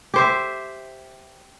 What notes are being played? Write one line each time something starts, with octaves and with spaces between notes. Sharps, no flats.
G4 C5 E5